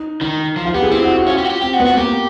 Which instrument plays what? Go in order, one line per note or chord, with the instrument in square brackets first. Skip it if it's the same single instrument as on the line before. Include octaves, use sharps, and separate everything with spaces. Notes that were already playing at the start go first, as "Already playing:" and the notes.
Already playing: [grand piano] D#4
[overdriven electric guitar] D#3 [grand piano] D#4
[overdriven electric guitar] F3
[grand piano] F4
[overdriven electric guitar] B3 [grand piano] G4
[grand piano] G#4
[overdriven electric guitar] C4 [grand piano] E4
[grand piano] F#4
F#4
[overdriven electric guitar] C#4 [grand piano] F4
[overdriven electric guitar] G4
F#4
G4
[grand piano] C4 [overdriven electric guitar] G4
[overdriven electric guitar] F#4
[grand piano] B3
[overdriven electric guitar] F#4
[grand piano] A#3 [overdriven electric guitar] G4